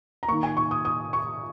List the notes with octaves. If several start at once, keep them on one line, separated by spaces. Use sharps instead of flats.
A#5
D#3 A#3 C#6
G#5
C#6
D#6
D#6
C#6